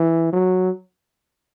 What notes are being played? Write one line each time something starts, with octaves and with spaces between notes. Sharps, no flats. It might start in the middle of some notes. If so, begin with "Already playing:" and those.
Already playing: E3
F#3